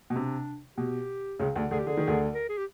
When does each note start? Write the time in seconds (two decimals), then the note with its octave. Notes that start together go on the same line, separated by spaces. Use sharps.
0.10 B2
0.15 C3 D4
0.77 B2 G4
1.40 C#2 C#3
1.56 D2 D3
1.71 D2 D3 G#4
1.79 G4
1.87 D3 G#4
1.97 D#3
2.07 D2 D3
2.34 A#4
2.49 G#4
2.57 G4